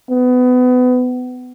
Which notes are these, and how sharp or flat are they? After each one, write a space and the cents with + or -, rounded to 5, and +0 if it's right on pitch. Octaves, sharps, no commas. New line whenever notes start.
B3 +25